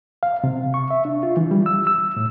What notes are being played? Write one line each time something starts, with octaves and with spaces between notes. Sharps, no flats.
F5
C3
C#6
E5
D4
F4
E3
G3
E6
E6
A2